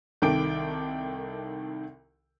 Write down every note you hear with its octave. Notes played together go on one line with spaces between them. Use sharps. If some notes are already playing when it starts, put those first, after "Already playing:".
C2 D#3 A4 G5 D6 D7